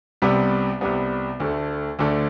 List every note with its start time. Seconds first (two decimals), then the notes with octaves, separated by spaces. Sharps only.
0.22 C2 C3 G3 B3
0.81 C2 C3 G3 B3
1.40 D2 D3 A3
1.99 D2 D3 A3